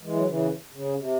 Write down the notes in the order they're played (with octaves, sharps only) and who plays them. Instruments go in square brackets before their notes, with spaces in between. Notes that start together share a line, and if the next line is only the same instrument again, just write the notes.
[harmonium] E3 G#3
F#3
C#3 E3
C#3
C3